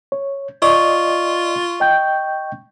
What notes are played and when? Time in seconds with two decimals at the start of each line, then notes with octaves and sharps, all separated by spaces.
0.12 C#5
0.62 F4 D5 D#5 C#6
1.80 D#5 G5 G6